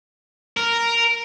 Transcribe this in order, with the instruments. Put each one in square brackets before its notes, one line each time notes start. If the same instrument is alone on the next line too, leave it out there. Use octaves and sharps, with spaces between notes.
[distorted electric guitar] A#4